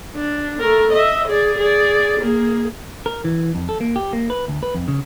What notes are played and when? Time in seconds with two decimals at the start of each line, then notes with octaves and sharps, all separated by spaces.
0.15 D4
0.60 A3 A#4
0.92 D#5 E5
1.28 G#4 D5
1.58 G#4 D5
2.20 A#3 G#4
3.06 A#4
3.24 E3
3.55 F2
3.69 A4
3.81 A#3
3.96 G4
4.13 A#3
4.30 B4
4.48 D2
4.63 B4
4.75 F2
4.88 C#3